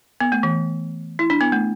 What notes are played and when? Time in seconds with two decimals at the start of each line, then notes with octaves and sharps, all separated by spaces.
0.20 B3
0.32 A3
0.43 E3
1.19 E4
1.30 D4
1.41 B3
1.52 A3